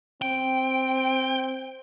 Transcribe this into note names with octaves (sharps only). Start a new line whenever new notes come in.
C4 G5